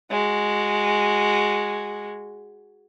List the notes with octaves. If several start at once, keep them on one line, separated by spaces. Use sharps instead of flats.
G#3 F#4